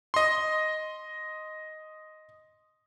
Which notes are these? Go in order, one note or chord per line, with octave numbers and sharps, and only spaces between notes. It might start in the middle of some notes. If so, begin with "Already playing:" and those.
D#5 C6